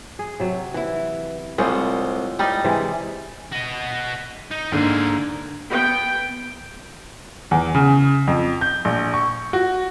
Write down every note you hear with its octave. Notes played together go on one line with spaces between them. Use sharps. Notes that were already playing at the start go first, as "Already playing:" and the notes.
G#4
C3 F#3
E3 E4
C2 A2 F3 G#3
G3 D#4
C3 E3 G#3
F#4 D#5
D#4
G#2 D3 A#3 G#4 A#4
B3 G5
E2
C#3
F2
G6
A#1
C#6
F#4